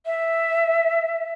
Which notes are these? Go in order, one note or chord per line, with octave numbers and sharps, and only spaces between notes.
E5